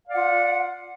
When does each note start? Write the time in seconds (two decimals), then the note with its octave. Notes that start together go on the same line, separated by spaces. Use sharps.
0.06 F5
0.09 D5
0.12 F#5
0.15 F4